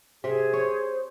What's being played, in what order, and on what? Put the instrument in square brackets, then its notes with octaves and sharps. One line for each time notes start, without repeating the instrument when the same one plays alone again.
[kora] C3 E5 [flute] G#4
[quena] C5 [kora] C#5